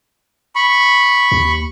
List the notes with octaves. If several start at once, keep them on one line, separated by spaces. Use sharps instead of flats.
B5 C#6
D#2